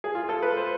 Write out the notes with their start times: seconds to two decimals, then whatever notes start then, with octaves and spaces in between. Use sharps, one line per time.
0.04 G#4
0.15 F4
0.29 A4
0.42 B4
0.57 C5